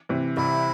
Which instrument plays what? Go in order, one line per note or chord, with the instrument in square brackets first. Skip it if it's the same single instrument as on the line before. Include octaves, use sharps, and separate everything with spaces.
[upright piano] C3 E3
[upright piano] C2 [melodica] E4